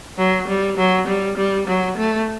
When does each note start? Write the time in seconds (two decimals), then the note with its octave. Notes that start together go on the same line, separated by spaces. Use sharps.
0.18 F#3
0.48 G3
0.77 F#3
1.07 G3
1.37 G3
1.67 F#3
1.98 A3